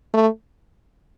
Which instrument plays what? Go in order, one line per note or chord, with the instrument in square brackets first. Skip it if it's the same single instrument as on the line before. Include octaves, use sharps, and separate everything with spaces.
[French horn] A3